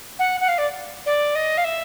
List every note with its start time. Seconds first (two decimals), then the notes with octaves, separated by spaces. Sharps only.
0.19 F#5
0.40 F#5
0.48 F5
0.58 D5
1.06 D5
1.35 D#5
1.57 F5
1.64 E5